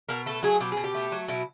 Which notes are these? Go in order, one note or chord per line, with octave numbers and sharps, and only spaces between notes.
B2 A#4
A3 A4
F#3 G#4
B2 G4
G#4
B2
G4
A3
F#3
B2 E4